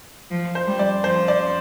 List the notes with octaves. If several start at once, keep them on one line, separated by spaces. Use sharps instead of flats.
F3
C5
G3
D5
F3 C5
D5